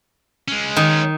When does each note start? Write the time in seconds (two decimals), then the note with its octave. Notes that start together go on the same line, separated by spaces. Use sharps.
0.48 G#3 C#4
0.77 D#3